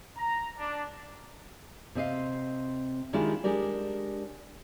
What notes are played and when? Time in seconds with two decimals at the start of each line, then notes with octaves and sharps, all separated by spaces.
0.16 A#5
0.58 D4
1.95 C3 C4 D#5 F5
3.13 D#3 G#3 D4 E4 F4 G4
3.44 G#3 D4 G4 A#4 D5